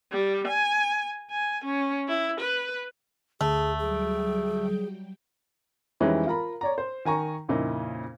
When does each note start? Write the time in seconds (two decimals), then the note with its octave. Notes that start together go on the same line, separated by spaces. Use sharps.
0.12 G3
0.47 G#5
1.31 G#5
1.64 C#4
2.08 E4
2.40 B4
3.41 D2 A3 G#4
3.79 F#3 G3 G#4 G5
6.00 F2 E3 G3 G#3 C#4 D#4
6.27 F4 A#4 A#5 B5
6.61 C#5 D5 A#5
6.78 C5
7.05 D#3 G#5 A#5 C#6
7.49 F2 A#2 C#3 D#4 E4